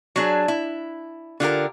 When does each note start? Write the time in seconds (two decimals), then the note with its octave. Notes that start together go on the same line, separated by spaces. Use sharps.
0.16 F#3 D4 G#4
0.48 E4
1.40 D3 F4 G4 A#4